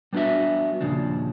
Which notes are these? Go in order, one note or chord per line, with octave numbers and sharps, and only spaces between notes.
G3 B3 D4 F4 F#4 E5
D#2 A#2 C#3 F3 D4